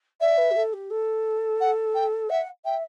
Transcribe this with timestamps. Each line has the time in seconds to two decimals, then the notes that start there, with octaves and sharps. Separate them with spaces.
0.21 D5 E5
0.38 B4
0.51 G4
0.56 A4
0.73 G4
0.90 A4
1.61 F#5
1.95 G5
2.30 E5 F#5
2.65 E5 G5